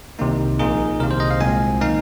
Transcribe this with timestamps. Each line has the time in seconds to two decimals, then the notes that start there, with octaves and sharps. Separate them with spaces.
0.19 C2 C3 D#3 A#3 D#4
0.59 A#1 A#2 A#3 D#4 G#4
1.00 C2 C3 D#3 A#3 A#4
1.11 C5
1.20 D#5
1.31 F5
1.41 C2 A#2 G#3 C4 G#5
1.81 D#3 A#3 D#4 F5